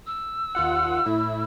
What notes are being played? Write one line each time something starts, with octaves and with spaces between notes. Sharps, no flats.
E6
D#2 F4 F#5
A2 E4